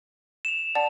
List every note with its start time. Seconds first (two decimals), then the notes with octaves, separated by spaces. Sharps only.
0.45 E7 F7
0.75 D5 F#5 A5